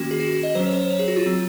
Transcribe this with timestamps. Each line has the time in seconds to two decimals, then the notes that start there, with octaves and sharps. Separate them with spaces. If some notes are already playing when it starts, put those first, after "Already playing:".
Already playing: D#3 A#3 C#4 F#4
0.11 G#4
0.20 F#4
0.32 F#4
0.43 D#5
0.55 F#3 C#4 C5
0.66 C#5
0.73 C5
0.90 C#5
0.99 G#4
1.08 F#4
1.17 F4
1.26 F#3 C4